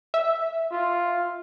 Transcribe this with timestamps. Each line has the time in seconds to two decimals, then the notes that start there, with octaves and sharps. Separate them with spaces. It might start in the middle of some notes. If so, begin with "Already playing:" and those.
0.14 E5
0.71 F4